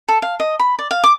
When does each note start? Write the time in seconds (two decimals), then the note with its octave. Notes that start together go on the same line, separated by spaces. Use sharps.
0.09 A4
0.22 F5
0.40 D#5
0.59 B5
0.79 D5
0.91 F5
1.04 D6